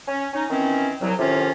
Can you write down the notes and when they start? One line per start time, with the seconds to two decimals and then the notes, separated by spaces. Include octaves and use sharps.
0.08 C#4
0.34 C#4 D#4
0.50 D#3 E3 C4 C#4
1.01 C2 F#3
1.19 A2 C3 D#3 C#4 F4